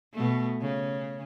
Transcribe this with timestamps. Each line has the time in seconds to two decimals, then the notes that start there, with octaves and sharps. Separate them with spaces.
0.14 B2 A3
0.61 C#3